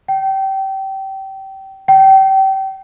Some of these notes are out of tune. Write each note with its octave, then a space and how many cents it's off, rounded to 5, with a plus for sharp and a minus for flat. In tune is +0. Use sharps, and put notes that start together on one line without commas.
G5 -25
G5 -30